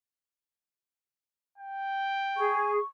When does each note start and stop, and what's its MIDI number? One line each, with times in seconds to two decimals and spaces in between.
1.58 2.62 79
2.37 2.77 68
2.37 2.86 85